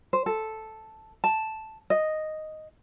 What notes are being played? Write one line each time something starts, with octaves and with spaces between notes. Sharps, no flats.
C5
A4
A5
D#5